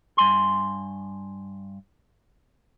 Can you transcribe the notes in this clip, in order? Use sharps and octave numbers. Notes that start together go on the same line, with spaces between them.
G2 G#5 C6